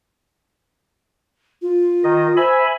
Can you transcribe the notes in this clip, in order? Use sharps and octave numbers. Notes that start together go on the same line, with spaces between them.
F4
D#3 D#5
C5 E5 G#5 B5